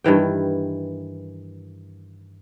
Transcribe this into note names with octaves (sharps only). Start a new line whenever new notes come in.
G2 D#3 E3 G5